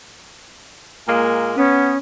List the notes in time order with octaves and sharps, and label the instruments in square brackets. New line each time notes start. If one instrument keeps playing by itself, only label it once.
[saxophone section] A#2 G#3 A#3
[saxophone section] B3 [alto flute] C#4